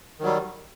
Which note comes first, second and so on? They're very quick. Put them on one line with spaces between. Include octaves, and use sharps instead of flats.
D#3 F#3 G3